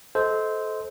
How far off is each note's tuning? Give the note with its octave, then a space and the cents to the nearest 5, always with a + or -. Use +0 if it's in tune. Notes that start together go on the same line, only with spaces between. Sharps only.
A4 -25 C5 -10 D#5 +25